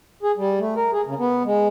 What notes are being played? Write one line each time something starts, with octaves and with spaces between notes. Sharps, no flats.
G#4
G3
A3
A#4
G#4
C#3
B3
G#3